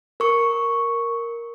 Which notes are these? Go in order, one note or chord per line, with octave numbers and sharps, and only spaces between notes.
A#4 C#6